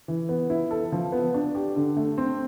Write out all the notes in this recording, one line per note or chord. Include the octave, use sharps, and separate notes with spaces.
E3
B3
E4
A4
F3
B3
D4
G4
D3
A3
C4